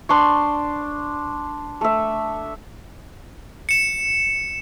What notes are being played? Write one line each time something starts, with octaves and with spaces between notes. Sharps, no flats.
D4 C6 C#6
A3 E5
C#7 E7